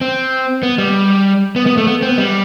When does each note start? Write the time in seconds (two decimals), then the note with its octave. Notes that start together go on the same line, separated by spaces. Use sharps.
0.01 C4
0.63 B3
0.78 G3
1.56 B3
1.66 B3
1.77 A3
1.87 B3
2.02 C4
2.09 B3
2.18 G3